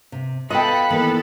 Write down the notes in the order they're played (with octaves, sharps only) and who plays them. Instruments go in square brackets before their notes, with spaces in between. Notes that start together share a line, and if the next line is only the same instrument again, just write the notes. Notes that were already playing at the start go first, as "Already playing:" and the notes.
[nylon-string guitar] C3
[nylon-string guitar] B3 F4 [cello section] A4 [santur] D#5 G5 [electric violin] B5 F#6
[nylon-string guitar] D#3 E3 A#3 [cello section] B3 A4